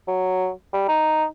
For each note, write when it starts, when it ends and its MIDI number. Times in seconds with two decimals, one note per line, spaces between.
0.08 0.50 54
0.73 0.85 55
0.88 1.25 63